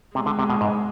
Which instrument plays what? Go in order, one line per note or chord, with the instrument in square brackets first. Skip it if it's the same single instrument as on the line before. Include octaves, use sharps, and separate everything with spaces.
[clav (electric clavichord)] C3 [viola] G#3
[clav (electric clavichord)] D3
C3
B2
G#2